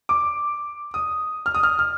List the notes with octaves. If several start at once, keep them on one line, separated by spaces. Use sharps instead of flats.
D6
D#6
F6
D#6
F6
F6